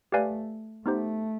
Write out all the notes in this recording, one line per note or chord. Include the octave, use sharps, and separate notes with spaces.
A3 G4 B4 D5 F5 G#5
A3 B3 D#4 G4 C5